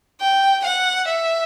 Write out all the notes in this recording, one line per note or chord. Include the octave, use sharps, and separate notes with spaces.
G5
F#5
E5